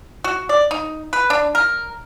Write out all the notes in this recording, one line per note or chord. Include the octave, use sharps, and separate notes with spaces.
F#4
D5
D#4
B4
D4
A#4